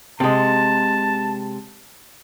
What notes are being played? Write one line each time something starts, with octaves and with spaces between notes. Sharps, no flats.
C3 G#3 A5